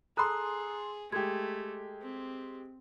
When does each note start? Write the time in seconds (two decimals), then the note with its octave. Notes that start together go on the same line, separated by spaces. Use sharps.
0.17 G#4 A4 A#5 C6 D#6 F#6
1.12 G#3 A3 G4 G#6
2.02 C4